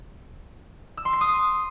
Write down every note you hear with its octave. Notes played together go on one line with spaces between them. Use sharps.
E6
C6
C7
D#6